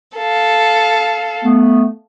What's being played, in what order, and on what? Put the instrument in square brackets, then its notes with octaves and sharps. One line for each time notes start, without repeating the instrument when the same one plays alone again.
[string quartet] A4 F5
[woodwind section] A3 B3